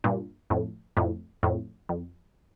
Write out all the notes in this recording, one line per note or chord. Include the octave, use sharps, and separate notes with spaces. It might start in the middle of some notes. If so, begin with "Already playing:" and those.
G2 A#2
F2 A2
F2 A2
F2 A2
F2